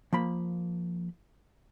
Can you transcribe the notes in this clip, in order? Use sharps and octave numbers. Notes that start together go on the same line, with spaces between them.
F3 A#3 B5